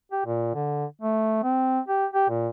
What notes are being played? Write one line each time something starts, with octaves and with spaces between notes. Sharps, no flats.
G4
A#2
D3
A3
C4
G4
G4
A#2